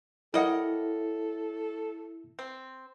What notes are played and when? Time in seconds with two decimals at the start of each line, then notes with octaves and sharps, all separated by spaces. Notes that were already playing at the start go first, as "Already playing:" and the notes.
0.34 G3 E4 A4 A#4 C#5 D#5 E5 F#5
2.39 C4